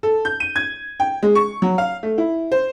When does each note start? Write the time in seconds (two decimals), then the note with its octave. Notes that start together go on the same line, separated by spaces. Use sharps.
0.03 A4
0.25 G6
0.40 D#7
0.56 G#6
1.00 G5
1.23 G#3
1.35 C#6
1.62 F#3
1.78 F5
2.03 A3
2.18 E4
2.52 C5